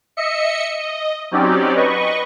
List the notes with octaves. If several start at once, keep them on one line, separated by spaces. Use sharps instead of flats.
D#5 E5 C#7
D#5
F#3 C4 C#4 D#4 G4 D5
B4 D#5 C#6